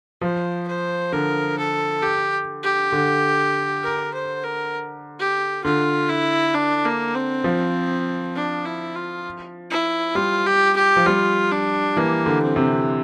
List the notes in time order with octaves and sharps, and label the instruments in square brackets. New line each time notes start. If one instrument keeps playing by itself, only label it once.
[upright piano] F3 [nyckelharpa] C5
[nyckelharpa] C5
[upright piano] D3 [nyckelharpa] A#4
[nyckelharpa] A4
G4
G4
[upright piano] D3
[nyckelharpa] A#4
C5
A#4
G4
[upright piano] D3 [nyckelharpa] F4
[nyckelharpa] E4
D4
A#3
C4
[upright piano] F3
[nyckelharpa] D4
E4
F4
E4
[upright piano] G3 [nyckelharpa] F4
[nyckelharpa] G4
G4
[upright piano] F3
[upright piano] G3 [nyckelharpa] F4
[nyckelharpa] D4
[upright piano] E3 [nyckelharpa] A#3
[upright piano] D3
[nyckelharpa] C4
[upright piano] C3